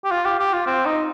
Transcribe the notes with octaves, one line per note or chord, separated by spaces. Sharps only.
G4
F4
G4
G4
F4
C4
D#4